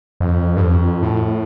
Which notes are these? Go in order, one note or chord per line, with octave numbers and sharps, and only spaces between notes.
F2
G2
F2
A2